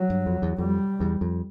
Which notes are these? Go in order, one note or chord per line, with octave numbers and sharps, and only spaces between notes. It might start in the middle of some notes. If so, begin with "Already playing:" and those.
Already playing: F#3
G2
F2
E2
F2 G3
E2
F2